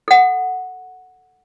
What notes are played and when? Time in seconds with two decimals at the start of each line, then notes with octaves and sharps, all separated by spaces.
0.08 A4 F#5